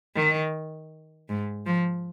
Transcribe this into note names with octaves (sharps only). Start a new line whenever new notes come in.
D#3
G#2
F3